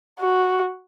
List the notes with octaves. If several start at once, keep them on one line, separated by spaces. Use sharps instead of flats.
F#4